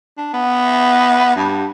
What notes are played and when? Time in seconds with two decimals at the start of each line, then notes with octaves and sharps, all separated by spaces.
0.17 D4
0.33 B3
1.36 G2